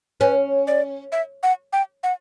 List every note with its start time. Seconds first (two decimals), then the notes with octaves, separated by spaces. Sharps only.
0.20 C#4 B4
0.67 D5
1.12 E5
1.43 F#5
1.73 G5
2.03 F#5